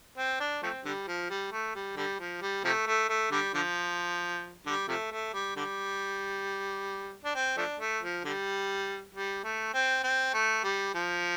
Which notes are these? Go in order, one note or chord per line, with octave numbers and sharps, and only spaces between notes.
C4
D4
F3 A3 C4
D3 G3
F3
G3
A3
G3
D3 G3
F3
G3
C3 F3 A3
A3
A3
D3 G3
D3 F3
D3 G3
C3 F3 A3
A3
G3
D3 G3
D4
C4
F3 A3 D4
A3
F3
D3 G3
G3
A3
C4
C4
A3
G3
F3